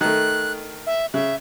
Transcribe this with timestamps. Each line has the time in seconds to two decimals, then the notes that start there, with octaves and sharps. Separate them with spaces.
0.01 D#3 A3 F#6
0.87 E5
1.14 C#3 E5